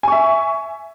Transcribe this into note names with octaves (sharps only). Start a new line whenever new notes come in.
E5 G#5 C#6